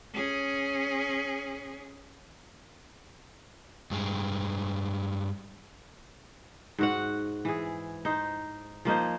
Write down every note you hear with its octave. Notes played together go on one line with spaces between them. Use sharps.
C#4 G#4
G2 G#3
G#2 F#4 F#5
E3 G#4
D#4 C5
F3 A#3 D#4 C5